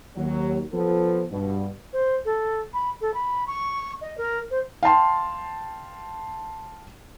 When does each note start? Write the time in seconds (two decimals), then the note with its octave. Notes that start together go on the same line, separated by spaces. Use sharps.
0.16 D#2 F#3
0.73 F3 B3 A4
1.31 G2 B2
1.93 C5
2.25 A4
2.74 B5
3.01 A4
3.14 B5
3.47 C#6
4.01 D#5
4.18 A#4
4.51 C5
4.83 F5 G5 A5 C6